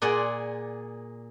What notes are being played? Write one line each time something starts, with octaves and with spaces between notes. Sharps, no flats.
A#2 G#4 D5 F#5 G#5